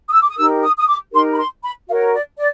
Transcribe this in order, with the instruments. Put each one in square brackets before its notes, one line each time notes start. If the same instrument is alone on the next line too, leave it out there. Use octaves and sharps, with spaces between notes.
[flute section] D#6
E6
D6
D#6
D#4 G4 A#4 E6
D#6
D#6
D6
D#4 G4 A#4 C6
B5
C6
B5
F#4 A#4 C#5 F5
D5
D5